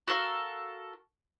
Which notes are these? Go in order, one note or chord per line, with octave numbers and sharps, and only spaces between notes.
F#4 A4 A#4 F5